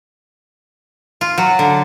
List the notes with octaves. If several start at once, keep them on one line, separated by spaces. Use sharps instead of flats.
F4
F#3
D3